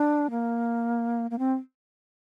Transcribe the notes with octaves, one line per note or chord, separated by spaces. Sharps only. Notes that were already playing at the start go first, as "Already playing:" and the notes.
Already playing: D4
A#3
A#3
C4